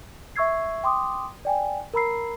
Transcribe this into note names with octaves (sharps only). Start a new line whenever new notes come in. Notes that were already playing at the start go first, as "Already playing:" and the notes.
E5 C#6 E6 G#6 C7
G5 C6 D6 D#6
D5 G5 G#5
A#4 A#5 B5 E6 C7